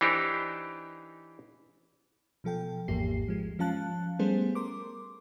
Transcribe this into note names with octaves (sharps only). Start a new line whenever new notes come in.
E3 D4 D#4 G4 A#4 C5
B2 F3 A4 G5
G#1 E2 G#2 A#3 G4 C7
F3 G#3
F3 C#4 F5 A5 F#6
G3 A3 B3 C#4 G#4 C5
A#4 C6 D6